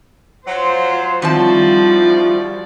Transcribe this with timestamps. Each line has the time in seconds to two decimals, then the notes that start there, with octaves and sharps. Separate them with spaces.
0.47 F#3 F4 C5
1.22 D#3 F3 G3 C4 E4 F#4 D5 A5